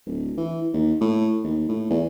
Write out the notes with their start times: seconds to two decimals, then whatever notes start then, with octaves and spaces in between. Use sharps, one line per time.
0.06 D1
0.38 E3
0.74 D#2
1.01 A2
1.44 D#2
1.69 A2
1.90 E2